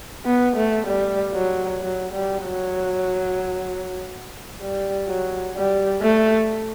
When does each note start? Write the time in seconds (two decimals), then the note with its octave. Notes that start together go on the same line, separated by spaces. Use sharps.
0.26 B3
0.57 A3
0.87 G3
1.35 F#3
1.82 F#3
2.13 G3
2.44 F#3
4.62 G3
5.08 F#3
5.56 G3
6.02 A3